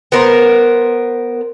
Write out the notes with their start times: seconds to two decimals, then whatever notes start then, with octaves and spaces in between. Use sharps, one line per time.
0.12 B3 A#4 C5